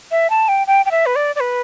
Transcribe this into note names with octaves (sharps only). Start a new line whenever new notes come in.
E5
A5
G5
G5
G5
E5
B4
D5
D5
B4